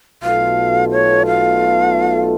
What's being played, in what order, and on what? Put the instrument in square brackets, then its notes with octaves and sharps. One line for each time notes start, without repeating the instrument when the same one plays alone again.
[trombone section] B1 B2 A3 F4 A4 [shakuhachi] F5
[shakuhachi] C#5
F5